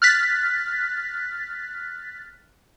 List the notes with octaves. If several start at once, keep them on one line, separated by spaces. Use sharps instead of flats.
F6 F#6 A6 B6